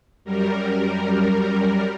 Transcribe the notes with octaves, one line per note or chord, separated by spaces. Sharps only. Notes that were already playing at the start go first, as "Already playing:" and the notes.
F#2 G3 A#4